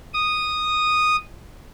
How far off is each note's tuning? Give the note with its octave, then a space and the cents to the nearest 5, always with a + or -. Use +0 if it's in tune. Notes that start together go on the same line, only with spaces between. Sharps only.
D#6 -10